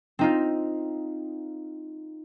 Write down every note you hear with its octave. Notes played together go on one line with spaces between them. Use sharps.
C4 D#4 F4